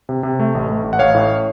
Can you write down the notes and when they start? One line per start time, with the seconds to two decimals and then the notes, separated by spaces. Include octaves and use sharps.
0.09 C3
0.23 C3
0.40 A3
0.55 A1
0.69 A3
0.84 A1
0.93 F#5
0.99 A1 C#5 F5
1.15 A2